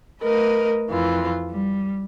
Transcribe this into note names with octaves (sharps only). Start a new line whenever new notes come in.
A3 A#4 B4 D#5
F2 E3 F4
G3